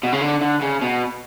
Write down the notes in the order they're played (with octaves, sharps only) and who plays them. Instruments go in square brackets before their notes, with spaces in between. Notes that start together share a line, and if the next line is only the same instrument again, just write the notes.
[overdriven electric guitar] B2
C#3
D3
D3
C#3
B2